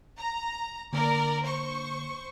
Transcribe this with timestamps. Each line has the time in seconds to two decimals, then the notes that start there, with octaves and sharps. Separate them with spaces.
0.18 A#5
0.93 D3 A#3 A#4 D5
1.43 C5 C#6